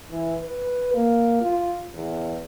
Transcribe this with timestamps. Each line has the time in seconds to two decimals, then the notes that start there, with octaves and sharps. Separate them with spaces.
0.11 E3
0.43 B4
0.95 A#3
1.42 F4
1.95 E2